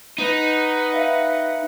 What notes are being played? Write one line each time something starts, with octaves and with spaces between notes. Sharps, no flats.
D#4 B4 F#5
E5 F5